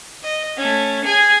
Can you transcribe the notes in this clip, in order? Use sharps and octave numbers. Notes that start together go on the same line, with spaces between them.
D#5
A3 C#4
G#4 G#5